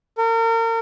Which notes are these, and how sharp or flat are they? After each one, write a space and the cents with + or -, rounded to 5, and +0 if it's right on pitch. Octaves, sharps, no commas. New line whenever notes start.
A#4 -35